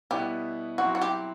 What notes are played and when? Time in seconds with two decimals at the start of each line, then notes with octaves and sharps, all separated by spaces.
0.10 B2 G3 B3 E4 G4
0.78 F#3 C4 E4 F#4
0.95 F#4
1.02 G4